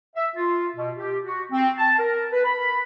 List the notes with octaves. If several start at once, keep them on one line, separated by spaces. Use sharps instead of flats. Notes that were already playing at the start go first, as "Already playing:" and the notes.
E5
F4
B2
G4
F#4
C4
A5
A#4
B4
B5